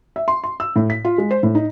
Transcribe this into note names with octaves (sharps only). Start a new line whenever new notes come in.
E5
C6
C6
E6
A2
B6
F4
G#3
C5
A2
D#4